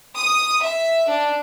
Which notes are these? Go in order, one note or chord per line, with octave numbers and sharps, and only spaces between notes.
D#6
E5
D4